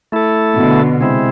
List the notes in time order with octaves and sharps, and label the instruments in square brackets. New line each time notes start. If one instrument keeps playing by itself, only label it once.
[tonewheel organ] A3 E4 A4
[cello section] B2 D3
[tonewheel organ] C3 G#3 C4 E4